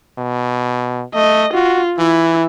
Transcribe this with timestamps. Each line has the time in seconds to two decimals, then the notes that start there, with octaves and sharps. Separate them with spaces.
0.18 B2
1.15 A3 D#5
1.54 F4 F#4
1.99 E3 E4